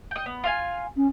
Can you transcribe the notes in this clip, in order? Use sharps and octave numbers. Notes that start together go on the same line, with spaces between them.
D#5 G5
B3
F4 F5 G#5
C#4